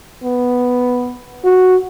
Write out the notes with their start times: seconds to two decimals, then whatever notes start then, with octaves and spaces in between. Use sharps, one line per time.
0.24 B3
1.44 F#4